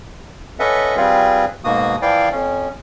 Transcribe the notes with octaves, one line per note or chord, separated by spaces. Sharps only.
C#4 A4 B4 D#5 E5 F#5
G3 C4 F4 G#4 B4
G#2 B2 A#3 F#4 D#6
E3 F3 E4 D5 F5 G5
F2 C#4